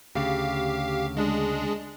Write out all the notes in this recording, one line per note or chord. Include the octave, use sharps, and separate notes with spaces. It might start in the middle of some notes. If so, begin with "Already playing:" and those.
D2 C#3 G4 F5
G#3 D4 G#4